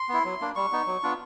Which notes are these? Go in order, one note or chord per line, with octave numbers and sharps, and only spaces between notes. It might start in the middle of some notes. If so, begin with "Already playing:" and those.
Already playing: C6
B3 E4
F#3
A#3 D4
G3 C#6
B3 D#4
F#3
B3 D4 F4